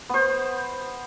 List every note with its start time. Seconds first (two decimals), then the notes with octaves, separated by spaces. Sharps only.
0.10 B3 C5